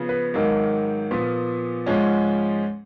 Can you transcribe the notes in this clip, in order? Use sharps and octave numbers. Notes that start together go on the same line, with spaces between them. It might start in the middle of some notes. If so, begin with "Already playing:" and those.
Already playing: C#3 F3 B3
B4
G#2 D#3 F#3 A#3
A#2 F3 B3
G#2 F3 G#3 C#4